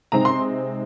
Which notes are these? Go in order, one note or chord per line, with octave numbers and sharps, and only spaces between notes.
C3 G#3 C4 D#4 A#5
C6